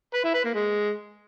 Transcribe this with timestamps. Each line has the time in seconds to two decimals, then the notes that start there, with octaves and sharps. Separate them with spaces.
0.14 B4
0.24 E4
0.34 B4
0.44 A#3
0.54 G#3